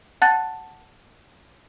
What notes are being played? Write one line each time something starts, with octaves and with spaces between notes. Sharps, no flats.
F#5 A5 F#6 A6